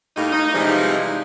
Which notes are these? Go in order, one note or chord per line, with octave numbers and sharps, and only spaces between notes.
A2 G3 A#3 D#4
D#4
C3 E3 F3 G3 G#3 D#4